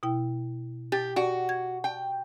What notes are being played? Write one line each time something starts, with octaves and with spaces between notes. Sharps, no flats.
B2 E4 G5
G4 A6
F#4 D5 F#5
G#6
G5